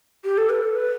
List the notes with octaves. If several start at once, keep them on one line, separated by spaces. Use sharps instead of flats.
G4
A4
B4
A4
B4